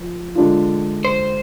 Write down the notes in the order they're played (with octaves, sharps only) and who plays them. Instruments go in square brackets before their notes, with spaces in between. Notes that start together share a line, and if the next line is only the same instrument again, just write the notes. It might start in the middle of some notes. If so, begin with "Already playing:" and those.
Already playing: [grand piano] F3
D3 G#3 D4 F4
[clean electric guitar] C5